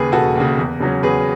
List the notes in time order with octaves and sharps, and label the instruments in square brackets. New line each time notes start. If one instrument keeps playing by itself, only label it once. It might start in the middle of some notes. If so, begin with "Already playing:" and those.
Already playing: [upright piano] D#2 C#3 G#4 B4
E1 F#4 A4
D#2 C#3
E2
C#3 F#3 C#4
E2 G#4 B4